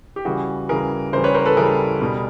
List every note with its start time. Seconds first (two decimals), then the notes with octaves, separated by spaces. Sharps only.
0.16 G4
0.25 C#3 E3 G3 F#4 G#4
0.69 C#3 E3 G3 G#4 A#4
1.13 C#3 E3 G3 A#4 C5
1.24 B4 C#5
1.34 A#4 C5
1.46 A4 B4
1.57 C#3 E3 G3 G#4 A#4
2.01 B2 G3